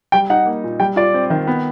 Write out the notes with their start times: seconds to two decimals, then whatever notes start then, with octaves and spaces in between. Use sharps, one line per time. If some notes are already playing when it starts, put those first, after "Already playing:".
0.12 G3 G5
0.30 D#4 F#5
0.46 A#3
0.64 A#2
0.80 G3 G5
0.96 F4 D5
1.14 C4
1.30 D#3
1.47 B3